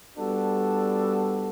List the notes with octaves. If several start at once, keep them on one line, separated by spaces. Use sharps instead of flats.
G3 B3 D4 F#4 A4